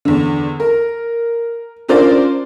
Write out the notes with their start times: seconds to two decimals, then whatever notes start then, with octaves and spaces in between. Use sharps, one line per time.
0.05 E2 D3
0.60 A#4
1.88 C#4 D4 F4 A#4 C5 D5